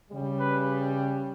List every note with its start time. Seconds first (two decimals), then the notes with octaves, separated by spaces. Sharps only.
0.11 C#3 G3
0.39 B4